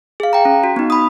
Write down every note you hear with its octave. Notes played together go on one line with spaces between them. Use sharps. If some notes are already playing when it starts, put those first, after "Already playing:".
G#4 F5
G5 A#5
C#4
F#4
B3 D#4
B5 D#6